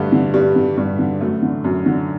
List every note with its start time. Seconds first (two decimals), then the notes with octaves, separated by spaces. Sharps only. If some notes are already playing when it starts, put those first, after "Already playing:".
Already playing: G2 D3 A3
0.12 D3
0.34 G2 G3
0.56 D3
0.77 G2
0.99 D3
1.21 F#2 A3
1.42 D3
1.64 F#2
1.86 D3